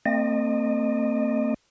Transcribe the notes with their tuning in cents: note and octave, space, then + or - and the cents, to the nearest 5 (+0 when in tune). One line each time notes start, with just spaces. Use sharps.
A3 +45 C4 +0 D#5 -30